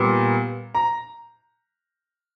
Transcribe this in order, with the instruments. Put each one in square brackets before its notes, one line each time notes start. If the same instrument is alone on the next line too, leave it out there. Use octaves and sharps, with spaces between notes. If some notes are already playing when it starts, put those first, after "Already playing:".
Already playing: [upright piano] A#2 G3 B3
A#5